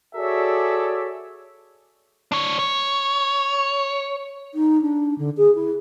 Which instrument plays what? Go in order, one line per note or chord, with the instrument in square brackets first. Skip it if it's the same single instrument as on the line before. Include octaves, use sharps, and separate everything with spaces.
[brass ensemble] F#4 G#4 A4 C#5 D5 E5
[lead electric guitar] D4 C#5
C#5
[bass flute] D#4
D4
D3
G#4
E4